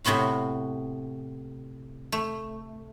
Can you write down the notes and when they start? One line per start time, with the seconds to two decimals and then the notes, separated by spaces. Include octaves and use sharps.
0.04 A2 C3 B3 F#4 F5
2.12 A3